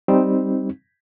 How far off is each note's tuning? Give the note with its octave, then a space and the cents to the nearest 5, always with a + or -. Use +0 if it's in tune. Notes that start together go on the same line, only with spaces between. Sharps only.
G3 +0 C4 +0 D#4 +0